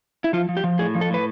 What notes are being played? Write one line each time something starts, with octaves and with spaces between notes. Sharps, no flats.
E4
F3 F4
F3
G4
F3
A2 G#4
F3
A4
A2 B4